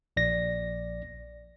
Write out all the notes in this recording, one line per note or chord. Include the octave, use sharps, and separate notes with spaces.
A#1 D5 A#6